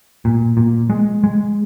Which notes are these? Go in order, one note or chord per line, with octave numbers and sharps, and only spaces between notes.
A#2
A#2
G#3
G#3